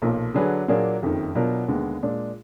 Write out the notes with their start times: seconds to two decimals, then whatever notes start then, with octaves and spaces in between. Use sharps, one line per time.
0.02 B1 A#2 F3
0.34 D3 F#3 D4 G#4 B4
0.68 A#2 F#3 A#3 D4 G#4
1.02 F#1 F2 D#3
1.35 B2 F#3 D4 F4 A#4
1.68 D#2 D3 G#3 B3
2.02 A#2 G#3 D4